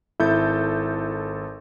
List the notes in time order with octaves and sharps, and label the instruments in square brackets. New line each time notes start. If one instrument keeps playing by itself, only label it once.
[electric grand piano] G#1 A4 G6 [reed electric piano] E4